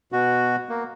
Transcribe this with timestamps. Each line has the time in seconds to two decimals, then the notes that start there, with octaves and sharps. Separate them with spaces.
0.12 B2 F#4
0.69 A#3